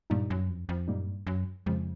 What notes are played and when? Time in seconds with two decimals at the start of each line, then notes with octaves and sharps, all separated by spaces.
0.10 G2 A#2 G3 A#3 D#4
0.30 F#2
0.49 F2
0.69 F2
0.88 F#2 A#2 G3 A#3 D#4
1.07 G2
1.27 F#2
1.66 F2 C#3 F3 G#3